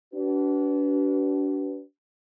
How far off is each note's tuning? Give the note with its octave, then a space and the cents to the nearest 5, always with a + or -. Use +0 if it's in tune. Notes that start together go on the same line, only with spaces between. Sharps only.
D4 -35 F#4 +40 B4 +0